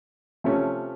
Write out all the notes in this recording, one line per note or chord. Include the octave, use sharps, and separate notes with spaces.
C3 F3 A3 C#4